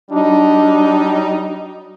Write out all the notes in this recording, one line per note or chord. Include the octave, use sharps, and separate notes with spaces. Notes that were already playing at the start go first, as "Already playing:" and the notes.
F#3 G3 D4 D#4